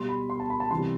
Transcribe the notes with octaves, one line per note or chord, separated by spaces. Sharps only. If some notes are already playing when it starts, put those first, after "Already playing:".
Already playing: B2 G3 C6
B5
C6
A5
B5
A5
C3 E3 G3 C6